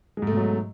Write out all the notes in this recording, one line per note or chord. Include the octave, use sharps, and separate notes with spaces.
G#2 B2 F#3 G#3 A3